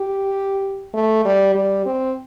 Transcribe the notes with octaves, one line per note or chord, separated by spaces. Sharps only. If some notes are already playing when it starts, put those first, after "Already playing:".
Already playing: G4
A3
G3
G3
C4